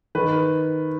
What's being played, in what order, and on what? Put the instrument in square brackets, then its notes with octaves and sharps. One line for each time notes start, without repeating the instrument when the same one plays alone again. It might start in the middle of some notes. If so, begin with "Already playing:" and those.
[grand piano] D#3 B4